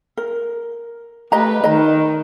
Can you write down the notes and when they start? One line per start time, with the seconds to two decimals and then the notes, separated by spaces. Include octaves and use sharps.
0.17 A#4
1.32 A3 G4 B4 D#5 A#5
1.64 D#3 D#5 A#5